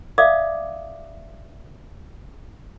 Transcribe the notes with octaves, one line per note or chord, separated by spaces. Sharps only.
D5 E5 F5 D6 D#6